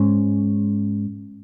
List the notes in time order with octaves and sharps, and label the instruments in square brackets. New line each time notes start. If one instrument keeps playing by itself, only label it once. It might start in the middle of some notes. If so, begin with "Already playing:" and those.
Already playing: [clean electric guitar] G#2 G#3 C#4